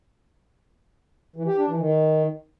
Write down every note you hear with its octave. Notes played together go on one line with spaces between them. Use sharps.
E3
G4
D4
E3
D#3